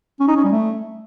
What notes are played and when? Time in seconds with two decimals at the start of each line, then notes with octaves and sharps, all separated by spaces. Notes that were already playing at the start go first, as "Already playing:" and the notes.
0.20 C#4
0.28 D#4
0.36 C#4
0.44 G3
0.52 A3